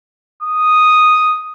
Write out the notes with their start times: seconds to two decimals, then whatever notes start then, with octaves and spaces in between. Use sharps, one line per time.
0.43 D#6